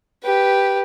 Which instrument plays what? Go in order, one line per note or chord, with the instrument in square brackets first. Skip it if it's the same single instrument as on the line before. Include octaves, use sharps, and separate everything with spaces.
[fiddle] G4 B4